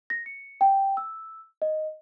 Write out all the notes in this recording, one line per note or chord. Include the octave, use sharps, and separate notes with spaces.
A#6
C#7
G5
E6
D#5